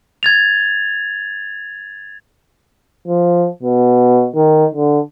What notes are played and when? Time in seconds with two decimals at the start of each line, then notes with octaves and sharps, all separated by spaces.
0.23 G#6 A6 F7
3.08 F3
3.63 B2
4.36 D#3
4.75 D3